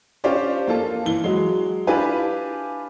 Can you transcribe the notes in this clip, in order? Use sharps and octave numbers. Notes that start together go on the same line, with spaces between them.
C#4 D4 F4 G4 C5 D5
A#3 F4 A4
E3 G7
F#3 G#3
D4 E4 F4 G4 B4 G#5